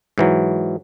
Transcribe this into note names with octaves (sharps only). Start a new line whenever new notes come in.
G#2 E3 F#3